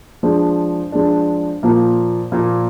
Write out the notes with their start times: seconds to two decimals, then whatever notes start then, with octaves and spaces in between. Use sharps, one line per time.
0.23 F3 G#3 D4
0.92 F3 G#3 D4
1.63 A#2 F3 A#3
2.32 A#2 F3 A#3